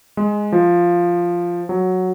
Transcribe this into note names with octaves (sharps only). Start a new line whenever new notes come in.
G#3
F3
F#3